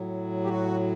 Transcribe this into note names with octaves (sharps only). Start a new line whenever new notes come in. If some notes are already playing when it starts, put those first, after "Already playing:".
Already playing: A2 F#3
G4
F#4